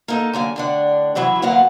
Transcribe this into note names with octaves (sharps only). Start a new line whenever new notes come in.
A#3 D#4 A4
D3 F#3 A#3 G#5
A2 D3 D4
C#3 E3 F#3 E4
D2 F#3 A#3 B3 F5 F#5